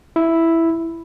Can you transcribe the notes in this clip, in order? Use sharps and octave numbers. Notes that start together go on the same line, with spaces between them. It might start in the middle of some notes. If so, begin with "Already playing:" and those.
E4